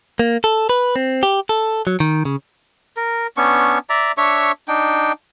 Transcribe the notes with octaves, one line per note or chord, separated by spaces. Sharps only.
A#3
A4
B4
C4
G4
A4
F#3
D#3
C#3
A#4
B3 C#4 D4 C#6
D5 E5 A#5
D4 C#5 E5 C#6
D4 D#4 G5